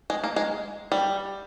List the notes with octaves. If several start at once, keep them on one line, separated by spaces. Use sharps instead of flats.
G#3
A#3
G#3
G3